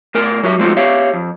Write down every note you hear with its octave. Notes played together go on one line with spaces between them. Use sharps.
A2 A#4 G#5
F#3 F#4 G4 E5
F3 G#3 A3 C4 F4 F#4
G4 C#5 E5 F5
F2